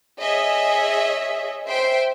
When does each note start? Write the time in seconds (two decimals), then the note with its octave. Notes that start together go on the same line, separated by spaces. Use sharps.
0.21 G#4 C#5 D#5 E5
1.67 C5 E5 G5 C6